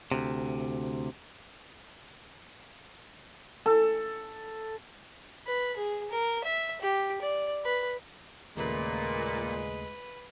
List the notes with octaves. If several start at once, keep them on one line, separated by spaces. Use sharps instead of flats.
D2 C3
A4
B4
G#4
A#4
E5
G4
D5
B4
D#2 A#2 C#3 G#3 A3 B4